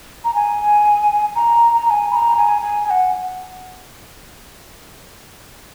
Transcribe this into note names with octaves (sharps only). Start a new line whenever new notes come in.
A#5
G#5
A#5
A#5
A#5
G#5
B5
A#5
G#5
G#5
G#5
F#5